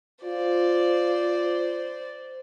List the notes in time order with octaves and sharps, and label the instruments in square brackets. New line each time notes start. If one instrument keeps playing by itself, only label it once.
[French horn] F4 [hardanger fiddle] C5 D5